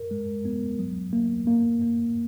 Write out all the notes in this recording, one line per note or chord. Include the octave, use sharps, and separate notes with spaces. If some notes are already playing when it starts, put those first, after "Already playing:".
Already playing: A#4
G#3
B3
F#3
A#3
A#3
A#3